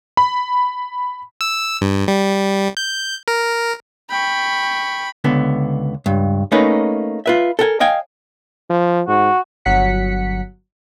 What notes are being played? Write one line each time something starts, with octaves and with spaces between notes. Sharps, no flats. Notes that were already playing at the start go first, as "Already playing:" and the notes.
B5
E6
G2
G3
G6
A#4
G5 B5 C#6
C#2 D3 B3
C#2 G2
A3 A#3 C#4 D#4 B4
F4 B4 E5
A4 A#4 G5 G#5
D#5 F5 G5 G#5
F3
G#2 F#4
G1 F#3 F#5 B6 C#7